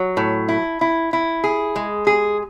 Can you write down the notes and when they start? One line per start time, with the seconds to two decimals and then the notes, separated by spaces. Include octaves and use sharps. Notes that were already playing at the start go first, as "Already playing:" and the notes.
Already playing: F#3
0.17 A2
0.48 E4
0.81 E4
1.13 E4
1.44 G#4
1.76 G#3
2.07 G#4